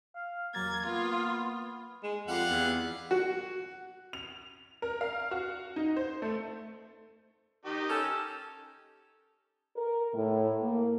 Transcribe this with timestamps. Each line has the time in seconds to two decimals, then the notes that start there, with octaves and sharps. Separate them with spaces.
0.15 F5
0.55 E2 F#3 A#3 G#6 A6
0.86 A#3 B3 F4
2.03 G#3
2.28 F2 G3 F5 F#5
2.50 E2
3.11 F#4
4.13 F7
4.82 A#4
5.01 F5
5.31 F#4
5.76 D#4
5.96 C5
6.22 A3
7.65 D#3 D#4 G4
7.90 C#4 A4
9.76 A#4
10.14 A2
10.61 A#3